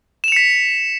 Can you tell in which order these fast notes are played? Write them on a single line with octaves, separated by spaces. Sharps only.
E7 F7 C#7 B6